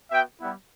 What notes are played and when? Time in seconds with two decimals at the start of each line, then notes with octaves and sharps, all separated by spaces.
0.11 B3 F#4 E5 G5
0.40 G3 B3 E4